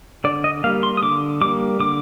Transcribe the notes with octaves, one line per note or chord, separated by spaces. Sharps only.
D3 D5
D#5
G3 A#3 F5
C6
D#6
D3 D6
G3 A#3 D6
D3 D6